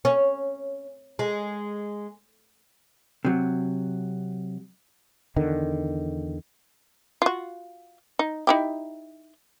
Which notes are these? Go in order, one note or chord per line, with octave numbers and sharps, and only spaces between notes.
C#4
G#3
C3 F#3
E2 D3 D#3
F4 F#4
D#4
D#4 E4 G4